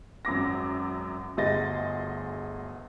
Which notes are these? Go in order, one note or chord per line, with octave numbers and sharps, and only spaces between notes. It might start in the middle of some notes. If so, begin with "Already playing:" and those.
G#1 F#2 D6 A#6
G1 D2 G#4 D#5 A6 A#6